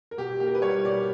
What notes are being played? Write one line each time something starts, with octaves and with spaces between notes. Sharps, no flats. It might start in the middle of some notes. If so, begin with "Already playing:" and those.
A#4
B2 G4
A#3 G4
A#4
B4
G3 C#5
B2 D5